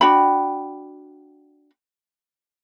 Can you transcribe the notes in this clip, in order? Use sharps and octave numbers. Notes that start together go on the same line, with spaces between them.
D4 F#4 G5 B5